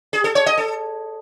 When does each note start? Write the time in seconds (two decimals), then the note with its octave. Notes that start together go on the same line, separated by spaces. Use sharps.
0.13 G#4
0.24 A4
0.35 C#5
0.46 D#5
0.58 A4